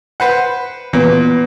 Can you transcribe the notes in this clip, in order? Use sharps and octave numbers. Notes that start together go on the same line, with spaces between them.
B4 C5 F#5
A#2 E3 B3